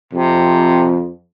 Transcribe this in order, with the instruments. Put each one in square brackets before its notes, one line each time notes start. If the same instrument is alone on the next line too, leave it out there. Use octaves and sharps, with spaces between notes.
[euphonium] F2 [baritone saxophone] C3